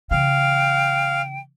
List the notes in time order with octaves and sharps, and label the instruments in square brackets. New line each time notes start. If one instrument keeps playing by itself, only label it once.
[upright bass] C#3 E3 [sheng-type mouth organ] F5 [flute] G5